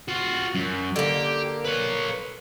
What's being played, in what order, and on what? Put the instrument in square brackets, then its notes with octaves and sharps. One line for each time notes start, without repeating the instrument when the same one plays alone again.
[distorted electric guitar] F4 F#4
F#2
[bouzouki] D3 A#3 [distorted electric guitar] G4
[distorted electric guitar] B4 C#5